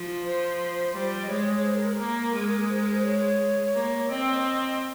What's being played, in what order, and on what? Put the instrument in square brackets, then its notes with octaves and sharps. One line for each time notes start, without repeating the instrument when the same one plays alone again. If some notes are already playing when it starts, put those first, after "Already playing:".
Already playing: [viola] F3
[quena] C5
[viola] G3
[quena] D#5
[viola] G#3 [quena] C#5
[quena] C#5
C#5
C5
A#4
A#4
[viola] A#3
G#3
[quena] C5
A#4
C5
C#5
[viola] A#3
[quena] C#5
[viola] C4 [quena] D#5